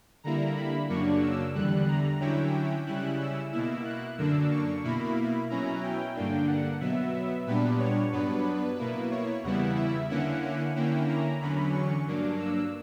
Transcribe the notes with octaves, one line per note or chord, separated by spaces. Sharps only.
D3 G3 A#3 E4 A#5
B5
F#2 C#3 F#3 A#3 D4 C#6
E6
E2 D3 G3 F#6
A#5
D3 F#3 C#4 E4 G5
G5
C#3 G3 C#4 E4 F#6
E6
B2 A#3 E4
F#6
F#2 D3 A#3 D4 E6
C#6
B2 A#3 E4 B5
B2 F#3 C#4 E4 A#5
G5
G2 D3 A#3 D4
F#5
B2 F#3 B3 E5
A#2 G3 B3 D4 B4
C#5
G2 F#3 B3 D4 B4
B2 A#3 E4
C#5
E2 C#3 G3 B3 E4 F#5
E5
D3 A#3 C#4 E4 F#5
F#5
D3 A#3 C#4 E4 G5
A#5
E2 D3 F#3 C#4 B5
C#6
G2 F#3 A#3 D4
E6